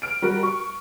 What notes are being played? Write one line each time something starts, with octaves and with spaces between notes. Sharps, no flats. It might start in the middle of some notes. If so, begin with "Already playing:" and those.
F6 D7
G3 F#4 A#4
C#6